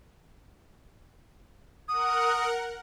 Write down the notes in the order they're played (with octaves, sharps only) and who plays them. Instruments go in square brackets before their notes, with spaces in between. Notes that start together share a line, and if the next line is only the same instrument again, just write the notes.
[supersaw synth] A#4 F#5 [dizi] D#6